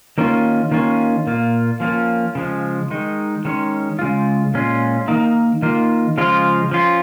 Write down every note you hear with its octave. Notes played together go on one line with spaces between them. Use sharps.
D#3 A#3 C#4 F4
D#3 A#3 C#4 F4
A#2 A#3 F4
F3 A#3 C#4 F4
C#3 F3 G#3
D#3 G#3 D#4
D#3 G#3 C#4
C#3 G#3 F4
A#2 G#3 C#4 F4
D#3 A#3 D#4
D#3 A#3 F4
C#3 F3 G#3 F4
F3 C#4 F4